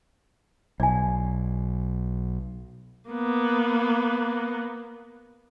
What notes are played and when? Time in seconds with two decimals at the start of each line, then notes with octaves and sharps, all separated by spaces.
0.80 B1 D5 G#5
3.10 A#3 B3